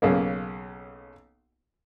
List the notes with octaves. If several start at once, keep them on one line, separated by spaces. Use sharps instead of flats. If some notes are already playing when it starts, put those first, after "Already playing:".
B1 C#3 A#3